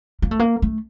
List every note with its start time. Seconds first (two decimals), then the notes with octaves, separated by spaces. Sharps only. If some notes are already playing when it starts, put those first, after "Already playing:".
0.22 A#3
0.31 A3
0.39 A#3
0.62 A3